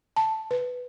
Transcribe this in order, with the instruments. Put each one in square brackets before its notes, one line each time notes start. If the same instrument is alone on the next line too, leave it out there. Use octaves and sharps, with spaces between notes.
[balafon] A5
B4